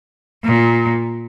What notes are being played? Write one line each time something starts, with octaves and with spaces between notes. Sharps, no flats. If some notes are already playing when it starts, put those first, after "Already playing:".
A#2